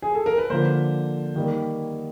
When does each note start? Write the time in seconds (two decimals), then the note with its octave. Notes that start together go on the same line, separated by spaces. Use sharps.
0.02 G#4
0.15 A4
0.26 A#4
0.38 B4
0.50 D3 F3 A#3 C5
1.35 D#3 G3 A#3